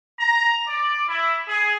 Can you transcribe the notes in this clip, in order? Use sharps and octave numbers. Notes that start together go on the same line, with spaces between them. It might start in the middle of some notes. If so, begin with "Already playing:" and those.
A#5
D5
E4
G#4